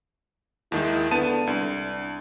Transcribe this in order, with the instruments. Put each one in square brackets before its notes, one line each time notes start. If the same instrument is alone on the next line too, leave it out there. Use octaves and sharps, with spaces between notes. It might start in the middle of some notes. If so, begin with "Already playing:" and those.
[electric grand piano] D#2 D#3 G#3 [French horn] E4
[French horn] D3 [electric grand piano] B3 A5 D#7
[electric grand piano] C2 [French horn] D4